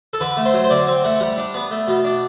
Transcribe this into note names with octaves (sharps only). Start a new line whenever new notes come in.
A4
D3 B4
A3
C5
F#3
C5
D3 D5
C4
A3 F#5
G3 F#5
D4
B3
A3
B2
D4